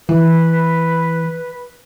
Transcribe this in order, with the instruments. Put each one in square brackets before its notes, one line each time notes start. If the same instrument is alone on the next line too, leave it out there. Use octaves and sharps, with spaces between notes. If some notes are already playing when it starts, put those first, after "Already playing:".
[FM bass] E3 [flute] B4